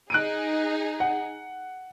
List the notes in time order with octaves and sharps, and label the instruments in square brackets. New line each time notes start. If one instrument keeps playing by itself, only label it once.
[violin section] D#4 G#4 [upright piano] F#6 D7 D#7
[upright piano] F#5